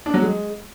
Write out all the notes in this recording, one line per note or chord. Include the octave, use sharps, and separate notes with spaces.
D4
F#3
G#3